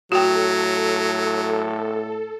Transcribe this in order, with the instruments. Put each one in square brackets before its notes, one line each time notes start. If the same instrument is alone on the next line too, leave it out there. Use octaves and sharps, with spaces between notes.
[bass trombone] A2 [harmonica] F#3 [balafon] F#4 G5 [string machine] A4